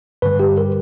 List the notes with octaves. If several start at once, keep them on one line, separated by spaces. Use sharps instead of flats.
G2 D3 G3 B4
G4
A#4